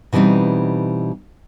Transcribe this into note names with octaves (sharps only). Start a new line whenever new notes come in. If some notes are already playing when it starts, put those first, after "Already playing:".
B2 E3 G3 C4 D#4